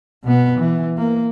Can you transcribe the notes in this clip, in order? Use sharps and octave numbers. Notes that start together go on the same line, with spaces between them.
B2 B3
E3
A#3